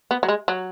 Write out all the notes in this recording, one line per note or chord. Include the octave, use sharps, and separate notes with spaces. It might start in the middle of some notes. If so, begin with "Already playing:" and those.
B3
F#3
G#3
F#3